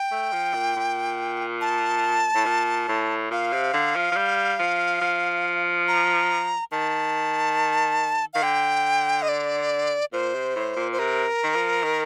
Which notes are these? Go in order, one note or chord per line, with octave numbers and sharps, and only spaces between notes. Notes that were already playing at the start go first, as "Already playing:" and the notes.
Already playing: G5
A3
F3
A#2
A#2
A5
A2
A#2
A2
A#2 F5
C3
D3
F3
F3
G3
F3
F3
A#5
D#3 A5
D#3 F5
D3 G5
D#5
D5
A#2 C5
C3
A2
A#2
C5
C3 A#4
D#3
F3
D#3